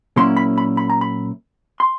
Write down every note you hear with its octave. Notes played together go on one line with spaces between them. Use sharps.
A#2 F#3 A#3 C#4 E4 C6
B5
B5
B5
A#5
B5
C6